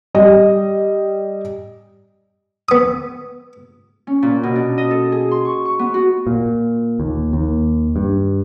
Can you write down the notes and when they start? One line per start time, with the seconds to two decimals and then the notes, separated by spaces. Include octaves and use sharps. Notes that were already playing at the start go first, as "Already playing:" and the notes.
0.14 G3 D#5
2.69 B3 D#6
4.07 C#4
4.23 A#2
4.43 B2
4.56 D4
4.78 D#5
4.91 A4
5.12 G#4
5.31 C6
5.45 C#6
5.65 C#6
5.79 B3
5.94 F#4
6.27 A#2
7.00 D#2
7.33 D#2
7.96 G2